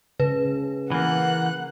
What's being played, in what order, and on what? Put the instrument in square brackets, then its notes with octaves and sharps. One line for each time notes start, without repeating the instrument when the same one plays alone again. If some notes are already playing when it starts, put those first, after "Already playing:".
[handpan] C#3 [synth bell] B4
[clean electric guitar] E3 A#3 [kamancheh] F#5 F#6